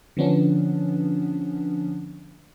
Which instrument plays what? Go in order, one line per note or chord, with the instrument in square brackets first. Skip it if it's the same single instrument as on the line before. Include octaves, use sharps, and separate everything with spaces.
[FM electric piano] D3 F3 B3 C#4 D4